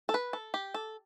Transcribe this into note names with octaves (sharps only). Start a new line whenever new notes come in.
A4
B4
A4
G4
A4